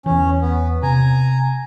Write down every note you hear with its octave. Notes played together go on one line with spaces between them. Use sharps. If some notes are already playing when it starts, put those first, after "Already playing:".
E2 E3 C#4
B3
C3 G#5 A#5